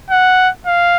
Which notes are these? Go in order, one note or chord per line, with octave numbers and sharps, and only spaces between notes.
F#5
F5